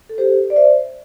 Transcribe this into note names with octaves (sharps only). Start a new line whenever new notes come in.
A4
G4 C5
D5
C5 E5